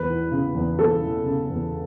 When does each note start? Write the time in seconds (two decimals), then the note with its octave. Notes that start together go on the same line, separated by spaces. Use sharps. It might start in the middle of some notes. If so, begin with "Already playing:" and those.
Already playing: E2 B4
0.08 E3
0.32 C#3
0.55 E2
0.79 E2 A4
1.02 E3
1.25 C#3
1.50 E2